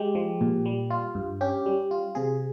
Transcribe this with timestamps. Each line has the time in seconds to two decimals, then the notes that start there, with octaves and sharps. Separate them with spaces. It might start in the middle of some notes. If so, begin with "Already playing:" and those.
Already playing: G#3 G4
0.15 F3
0.41 A#2
0.66 G3
0.91 F4
1.15 G2
1.41 C#4 G4
1.66 G3
1.91 F4
2.15 C3 G#4